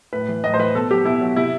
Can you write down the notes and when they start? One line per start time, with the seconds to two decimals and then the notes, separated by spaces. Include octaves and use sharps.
0.12 A2 B4
0.28 E3
0.44 A2 D#5
0.54 C5
0.59 E3 B4
0.74 B2 A4
0.90 F#3 G4
1.05 B2 E4
1.21 F#3
1.36 C3 E4